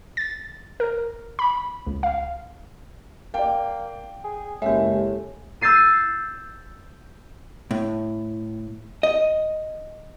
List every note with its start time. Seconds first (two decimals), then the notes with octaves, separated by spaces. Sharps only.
0.17 A6
0.80 A#4
1.39 B5
1.87 C#2
2.03 F5
3.34 A#3 D5 G5
4.24 G#4
4.62 F#1 A2 G#3 G4 E5
5.61 E6 G6 A6 C7 D#7
7.71 A2
9.03 D#5